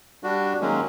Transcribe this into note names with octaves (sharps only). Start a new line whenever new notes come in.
G3 D4 F#4
D#3 F#3 G#3 A#3 C#4